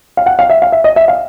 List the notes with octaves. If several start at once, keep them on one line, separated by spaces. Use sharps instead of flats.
F5
F#5
F5
E5
F5
E5
D#5
E5
F5